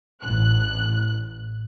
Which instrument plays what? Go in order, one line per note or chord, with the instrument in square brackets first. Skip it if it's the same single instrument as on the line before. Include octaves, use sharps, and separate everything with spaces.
[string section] A1 F#6